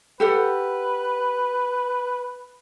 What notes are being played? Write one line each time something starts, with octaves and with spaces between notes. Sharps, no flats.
G4 A4 B4 F#5